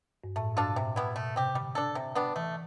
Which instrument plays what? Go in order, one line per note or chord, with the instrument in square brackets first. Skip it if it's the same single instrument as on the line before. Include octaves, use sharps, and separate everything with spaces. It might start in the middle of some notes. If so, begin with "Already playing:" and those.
[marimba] G2
[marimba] A2 [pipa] A3
[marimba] G2 [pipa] D4 F4 A4
[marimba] B2
[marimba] A2 [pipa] C3
[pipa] G3 B3 E4
[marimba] B2 [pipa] A3
[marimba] C3 [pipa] C4 G4
[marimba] D3 [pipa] G3
[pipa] D4 A4
C3
G3 B3 D4
[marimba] E3 [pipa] A3